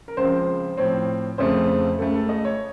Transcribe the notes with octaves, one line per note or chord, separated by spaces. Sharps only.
A#4
C#2 C#3 F3 C4 C5
A2 F3 C4 C#5
F2 C#3 A3 C4 C5
C#2 C#3 A3 A4
A4
D#5
C#5